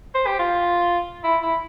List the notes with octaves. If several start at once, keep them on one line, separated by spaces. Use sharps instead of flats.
C5
G4
F4
E4
E4